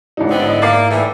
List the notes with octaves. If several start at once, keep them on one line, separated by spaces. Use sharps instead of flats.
A1 G#2 D#4 E4 D5
D3 B3 C4
D#5
A#3 D6 A6 C7
A2 E3